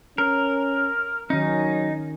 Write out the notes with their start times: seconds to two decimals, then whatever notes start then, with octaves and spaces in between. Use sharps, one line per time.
0.18 C#4 A#4
1.30 D#3 F#3 C#4 D#4